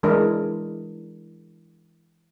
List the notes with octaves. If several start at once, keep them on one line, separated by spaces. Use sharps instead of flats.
E3 G#3 D4 A#4